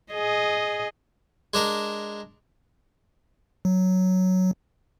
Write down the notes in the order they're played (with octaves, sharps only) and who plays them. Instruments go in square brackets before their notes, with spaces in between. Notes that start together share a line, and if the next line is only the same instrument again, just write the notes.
[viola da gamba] G#4 D#5
[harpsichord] G#3 D4 A#4
[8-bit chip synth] F#3